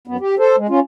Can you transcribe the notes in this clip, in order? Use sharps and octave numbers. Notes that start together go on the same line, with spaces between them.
F#2 B3
G4
A4 C5
G#3
C#4 F4